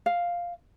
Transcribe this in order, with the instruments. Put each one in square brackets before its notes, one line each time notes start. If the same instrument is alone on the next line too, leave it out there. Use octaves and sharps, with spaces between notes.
[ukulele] F5